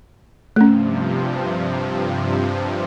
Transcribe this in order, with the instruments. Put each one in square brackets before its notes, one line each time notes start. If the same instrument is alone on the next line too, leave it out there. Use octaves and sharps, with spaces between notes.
[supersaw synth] G2 C3 F3 [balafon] A3 C#4